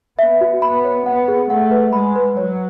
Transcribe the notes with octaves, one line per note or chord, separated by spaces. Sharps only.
B3 E5
F#4
B3 B5
C#5
B3 F#5
G#4
A3 F#5
B4
G#3 B5
B4
F#3 C#5